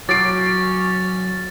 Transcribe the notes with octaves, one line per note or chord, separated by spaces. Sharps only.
F#3 C#4 D6 A6 C7 D7